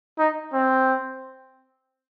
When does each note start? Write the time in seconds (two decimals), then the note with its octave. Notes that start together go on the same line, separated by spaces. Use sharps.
0.19 D#4
0.53 C4